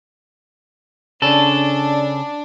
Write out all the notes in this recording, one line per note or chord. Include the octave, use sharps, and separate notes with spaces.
C#3 D4 A4